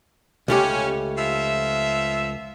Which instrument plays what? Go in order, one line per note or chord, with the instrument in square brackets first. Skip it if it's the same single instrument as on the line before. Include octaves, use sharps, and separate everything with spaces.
[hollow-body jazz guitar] C#2 A3 G4 [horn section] C#4
[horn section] F3 E5